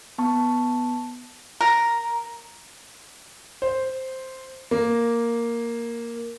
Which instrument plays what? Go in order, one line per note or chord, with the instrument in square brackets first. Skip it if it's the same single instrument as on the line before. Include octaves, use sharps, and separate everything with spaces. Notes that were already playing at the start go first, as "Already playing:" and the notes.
[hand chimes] B3 A5 C#6
[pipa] A#4
[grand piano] C5
A#3